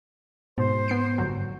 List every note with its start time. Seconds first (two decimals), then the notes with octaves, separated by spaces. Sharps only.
0.58 G#2 B2 C5
0.88 B3 C7 D7
1.18 G1 F#3